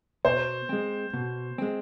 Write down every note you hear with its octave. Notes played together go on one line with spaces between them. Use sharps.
B2 C5
G#3 C4
B2
G#3 C4